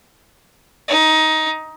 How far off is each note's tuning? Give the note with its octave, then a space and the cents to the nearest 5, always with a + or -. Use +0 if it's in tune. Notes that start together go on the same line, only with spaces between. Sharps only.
D#4 +15